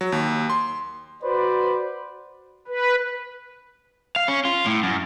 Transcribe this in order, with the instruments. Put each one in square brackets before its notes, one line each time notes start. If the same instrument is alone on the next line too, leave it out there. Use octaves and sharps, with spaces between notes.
[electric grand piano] F#3
D#2
C6
[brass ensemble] F#4 B4 C5 D5
[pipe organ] B4
[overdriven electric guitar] F5
C#4
F4
A2
F#2